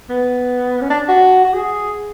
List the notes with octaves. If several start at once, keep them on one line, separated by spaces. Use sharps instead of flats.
B3
C#4
D4
F#4
F#4
G#4